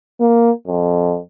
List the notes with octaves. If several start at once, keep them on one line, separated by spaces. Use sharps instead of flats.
A#3
F2